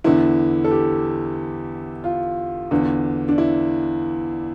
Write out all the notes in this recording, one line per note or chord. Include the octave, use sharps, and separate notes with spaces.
E2 D3 E4
A4
G4
F4
E2 D3
D4
E4